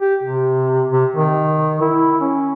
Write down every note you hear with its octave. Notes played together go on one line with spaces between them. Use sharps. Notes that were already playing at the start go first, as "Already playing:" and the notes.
G4
C3
C3
D#3
E4
C#4